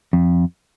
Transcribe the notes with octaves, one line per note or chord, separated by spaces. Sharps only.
F2